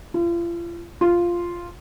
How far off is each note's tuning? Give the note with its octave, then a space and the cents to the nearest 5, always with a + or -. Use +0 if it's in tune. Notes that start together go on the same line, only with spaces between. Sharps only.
F4 -40
F4 -5